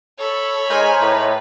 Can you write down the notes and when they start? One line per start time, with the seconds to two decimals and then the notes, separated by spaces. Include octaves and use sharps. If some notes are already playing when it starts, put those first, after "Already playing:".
0.19 A4 C#5 B5
0.70 G#3 D#4 A#4 C5 G#5
1.00 A2 B4